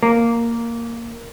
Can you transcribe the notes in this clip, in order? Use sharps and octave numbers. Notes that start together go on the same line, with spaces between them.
A#3